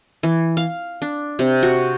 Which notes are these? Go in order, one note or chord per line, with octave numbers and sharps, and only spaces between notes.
E3
F5
D4
C3
F#4